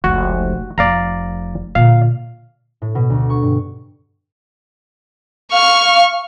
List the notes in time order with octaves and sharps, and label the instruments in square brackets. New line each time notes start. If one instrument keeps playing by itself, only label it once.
[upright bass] F1 C#2 [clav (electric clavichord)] F#4
[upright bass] F1 [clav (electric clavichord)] D5 F5 A#5
[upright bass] A#2 D3 [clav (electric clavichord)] F5
[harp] A2
B2
D2
C#6
G2
[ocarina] F5 [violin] C#6 F6